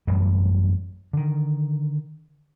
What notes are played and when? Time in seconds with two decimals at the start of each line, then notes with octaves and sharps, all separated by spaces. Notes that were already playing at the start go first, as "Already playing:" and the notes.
0.07 A1 F#2 G3
1.13 D3 D#3